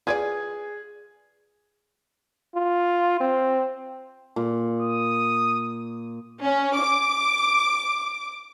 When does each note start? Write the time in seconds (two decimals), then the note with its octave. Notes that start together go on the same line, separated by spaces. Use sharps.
0.07 F4 G#4 B4 D5 G#6
2.55 F4
3.21 C4
4.36 A#2
4.80 D#6
6.42 C#4
6.78 D6